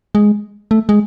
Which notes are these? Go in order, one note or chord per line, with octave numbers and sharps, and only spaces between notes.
G#3
A3
G#3